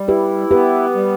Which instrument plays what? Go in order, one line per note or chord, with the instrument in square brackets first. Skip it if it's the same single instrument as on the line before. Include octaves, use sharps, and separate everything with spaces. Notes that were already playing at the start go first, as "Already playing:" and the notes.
Already playing: [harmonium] G3
[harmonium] E4 [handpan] G4 B4
[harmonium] B3 [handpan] G4 B4
[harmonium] G3